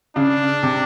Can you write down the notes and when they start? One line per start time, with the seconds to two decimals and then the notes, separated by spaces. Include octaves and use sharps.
0.16 C#3 D4
0.63 C3